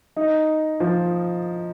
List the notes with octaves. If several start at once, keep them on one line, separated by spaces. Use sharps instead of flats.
D#4
F3